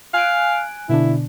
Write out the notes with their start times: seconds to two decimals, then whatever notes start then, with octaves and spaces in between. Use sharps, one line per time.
0.14 F5 G#5 F#6 D7
0.89 B2 D3 D4 E4